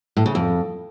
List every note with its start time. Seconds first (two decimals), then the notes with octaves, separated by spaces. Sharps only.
0.17 A2
0.26 C#3
0.35 F2